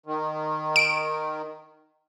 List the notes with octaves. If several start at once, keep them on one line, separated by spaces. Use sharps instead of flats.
D#3
D7